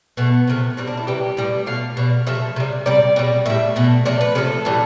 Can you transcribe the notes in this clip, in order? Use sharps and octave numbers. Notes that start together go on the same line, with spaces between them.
B2 A3 B3
C3 F3 A3
B2 G3 C4
D4
E4
C3 E3 G3 G4
A2 G3
B2 A3 F5
B2 G3
C3 F3 A3 E5
C3 G3
C3 G3 D5
B2 G3
A2 G3 E5
B2 A3
C3 F3 A3 D5
B4
C3 F3 A3 A4
A2 E3 G3